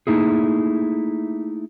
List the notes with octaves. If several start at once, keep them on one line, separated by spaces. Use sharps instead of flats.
A3 A#3 D#4 E4 G#4